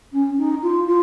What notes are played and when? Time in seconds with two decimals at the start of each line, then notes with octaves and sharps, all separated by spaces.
0.13 C#4
0.38 D#4
0.63 F4
0.87 F4